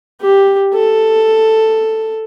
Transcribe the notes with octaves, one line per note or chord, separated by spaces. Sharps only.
G4
A4